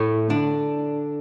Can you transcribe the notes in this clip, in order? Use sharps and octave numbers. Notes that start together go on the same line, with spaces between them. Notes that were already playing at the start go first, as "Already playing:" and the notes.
Already playing: A2 A3
D3 D4